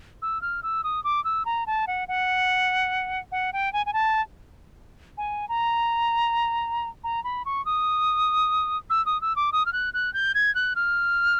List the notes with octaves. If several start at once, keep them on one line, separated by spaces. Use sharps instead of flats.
E6
F6
E6
D#6
D6
E6
A#5
A5
F#5
F#5
F#5
G5
G#5
G#5
A5
G#5
A#5
A#5
B5
C#6
D#6
E6
D#6
E6
D6
D#6
F6
F#6
F#6
G6
G#6
F#6
F6